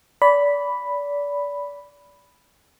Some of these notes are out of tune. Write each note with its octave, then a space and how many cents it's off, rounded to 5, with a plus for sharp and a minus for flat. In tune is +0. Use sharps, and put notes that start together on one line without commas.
D5 -30 B5 +0